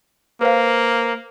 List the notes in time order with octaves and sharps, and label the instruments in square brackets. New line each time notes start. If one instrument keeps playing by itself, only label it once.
[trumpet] A#3 [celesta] B4 C5 F5